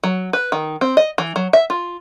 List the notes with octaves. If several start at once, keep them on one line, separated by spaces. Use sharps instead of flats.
F#3
B4
D#3
C4
D#5
E3
F#3
E5
F4